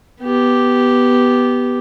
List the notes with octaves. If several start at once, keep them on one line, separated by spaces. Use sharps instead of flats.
B3 G4